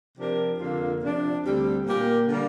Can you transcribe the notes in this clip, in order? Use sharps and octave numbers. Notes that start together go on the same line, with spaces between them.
C3 F3 D4 G4 A#4
F2 D3 A#3 F4
C3 F3 D4
D2 D3 G3 C4 G4
A#2 A#3 G4 A#4
D3 G3 A#3